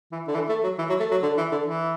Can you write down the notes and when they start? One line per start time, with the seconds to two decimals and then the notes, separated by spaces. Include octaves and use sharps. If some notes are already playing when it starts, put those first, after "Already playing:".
0.12 E3
0.27 D3
0.34 E3
0.49 A3
0.63 F#3
0.78 E3
0.89 F#3
1.00 A3
1.11 F#3
1.22 D3
1.37 E3
1.51 D3
1.66 E3